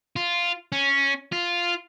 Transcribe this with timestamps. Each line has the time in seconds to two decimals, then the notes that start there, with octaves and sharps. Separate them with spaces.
0.16 F4
0.72 C#4
1.32 F4